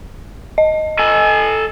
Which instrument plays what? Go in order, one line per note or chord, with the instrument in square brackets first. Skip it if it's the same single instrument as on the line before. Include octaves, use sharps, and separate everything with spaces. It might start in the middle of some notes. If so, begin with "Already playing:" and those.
[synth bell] D#5
[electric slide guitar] A4 G#5